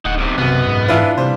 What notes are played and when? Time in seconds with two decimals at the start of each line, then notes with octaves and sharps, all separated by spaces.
0.05 D1 D#4 F#5
0.18 B1 C3
0.38 B1 F#2 C3 B3
0.67 G#2
0.88 E3 D4 F4 B4 E5
1.18 C3 G3 C5